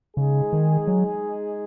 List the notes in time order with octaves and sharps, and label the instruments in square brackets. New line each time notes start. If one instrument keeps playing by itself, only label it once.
[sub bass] C#3 [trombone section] G#3 D#4 G#4
[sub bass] D#3
F#3